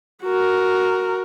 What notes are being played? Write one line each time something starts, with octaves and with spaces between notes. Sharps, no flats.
F#4 A#4